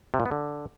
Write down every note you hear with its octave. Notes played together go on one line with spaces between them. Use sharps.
C3
A#2
B3
D3